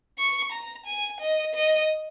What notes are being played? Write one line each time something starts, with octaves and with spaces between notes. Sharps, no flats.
C#6
A#5
G#5
D#5
D#5